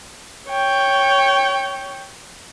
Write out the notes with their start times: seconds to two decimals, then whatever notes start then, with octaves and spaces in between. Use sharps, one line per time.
0.49 C#5 G5